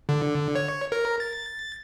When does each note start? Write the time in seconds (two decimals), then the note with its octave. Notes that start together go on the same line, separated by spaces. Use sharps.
0.09 D3
0.55 C#5
0.92 A#4
1.20 A6